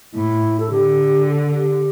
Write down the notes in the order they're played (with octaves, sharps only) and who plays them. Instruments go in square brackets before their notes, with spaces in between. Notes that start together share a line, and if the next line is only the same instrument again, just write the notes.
[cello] A2 [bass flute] E4
[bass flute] A4
[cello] D3 [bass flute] G4
[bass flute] A4
G4